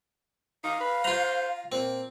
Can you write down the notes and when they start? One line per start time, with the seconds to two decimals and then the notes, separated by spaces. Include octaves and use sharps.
0.64 D#4 F5
0.81 B4
1.04 F4 C5 A#5
1.72 A#2 C4